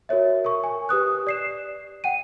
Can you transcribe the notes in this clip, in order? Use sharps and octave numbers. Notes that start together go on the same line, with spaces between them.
F#4 A#4 C#5 E5
A#4 C#6
G#5
G4 B4 D#6 F#6
D5 C7 E7
F#5 G5 D#7